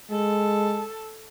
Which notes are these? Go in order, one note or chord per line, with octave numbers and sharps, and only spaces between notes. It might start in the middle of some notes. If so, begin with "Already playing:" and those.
G#3 A4